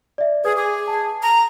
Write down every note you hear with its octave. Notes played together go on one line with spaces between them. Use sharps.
D5 E5
G#4 B4 D#6 G#6
G#4 D6
A5
A#5